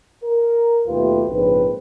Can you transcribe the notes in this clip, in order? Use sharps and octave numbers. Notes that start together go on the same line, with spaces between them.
A#4
D#2 B2 A3 F4 G4 B4
A#1 G#2 C#3 C4 B4